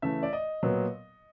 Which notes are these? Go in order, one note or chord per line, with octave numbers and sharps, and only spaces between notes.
C#3 E3 A3 E5
D5
D#5
A#2 F#3 B3